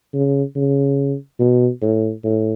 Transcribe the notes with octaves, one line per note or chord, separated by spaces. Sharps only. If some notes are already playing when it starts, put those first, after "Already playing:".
C#3
C#3
B2
A2
A2